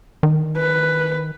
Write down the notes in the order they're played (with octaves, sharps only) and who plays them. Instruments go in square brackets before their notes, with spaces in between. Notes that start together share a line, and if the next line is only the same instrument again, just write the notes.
[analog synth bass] D#3
[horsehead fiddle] B4